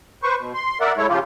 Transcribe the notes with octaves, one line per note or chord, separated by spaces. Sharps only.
B4 C5 C#6
B2
C6
A#4 D5 E5 F#5
G#3 A3 E4 C#5
C#3 F3 F4 G4